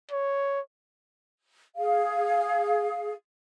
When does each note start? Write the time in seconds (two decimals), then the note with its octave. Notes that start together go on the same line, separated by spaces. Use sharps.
0.11 C#5
1.76 G#4 F5